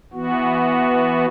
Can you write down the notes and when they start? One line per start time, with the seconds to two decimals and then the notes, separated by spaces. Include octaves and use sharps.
0.13 E3 B3 F#4